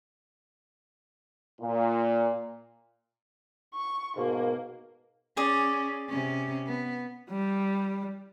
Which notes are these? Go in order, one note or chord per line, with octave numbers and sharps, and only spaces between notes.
A#2
C#6
G#2 B2 A#3
C#4 G#4 D5
C3 C#4
B3
G3